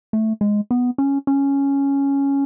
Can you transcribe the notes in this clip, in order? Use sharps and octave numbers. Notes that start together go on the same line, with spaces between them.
A3
G#3
B3
C#4
C#4